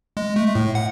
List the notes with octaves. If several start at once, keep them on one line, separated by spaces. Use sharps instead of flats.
G#3
A3
A2
F#5